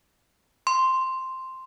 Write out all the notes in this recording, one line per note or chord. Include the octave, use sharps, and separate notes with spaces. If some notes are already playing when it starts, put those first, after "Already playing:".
C6